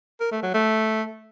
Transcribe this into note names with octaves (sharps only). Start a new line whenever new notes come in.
A#4
A3
F#3
A3